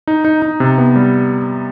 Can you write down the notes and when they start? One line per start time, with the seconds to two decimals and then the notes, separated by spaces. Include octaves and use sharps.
0.07 D#4
0.25 D#4
0.42 D#4
0.60 C3
0.78 B3
0.96 G3